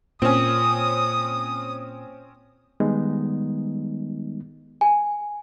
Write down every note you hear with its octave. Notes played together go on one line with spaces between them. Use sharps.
A#2 C4 C#4 D#6
D#3 G3 G#3 B3 D#4
G#5